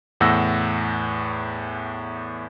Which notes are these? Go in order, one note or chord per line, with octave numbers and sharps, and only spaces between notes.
E2 A2 F#5 E6 A#6